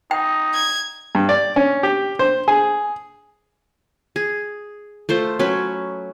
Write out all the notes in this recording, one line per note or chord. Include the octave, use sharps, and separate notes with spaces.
D#4 G5
G#6
G2
D5
C#4
G4
C5
G#4
G#4
A3 F4 C5
F#3 C#4 B4